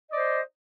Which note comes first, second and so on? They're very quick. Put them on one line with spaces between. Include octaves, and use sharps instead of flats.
D#5 D5 C5